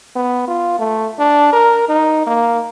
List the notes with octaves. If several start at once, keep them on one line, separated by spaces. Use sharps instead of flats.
B3
F4
A3
D4
A#4
D#4
A#3